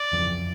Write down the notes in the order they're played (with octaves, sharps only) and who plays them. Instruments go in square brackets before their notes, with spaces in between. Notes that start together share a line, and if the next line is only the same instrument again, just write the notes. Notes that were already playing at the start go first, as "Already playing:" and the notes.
Already playing: [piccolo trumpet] D5
[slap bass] F#1 F2 C#3 E3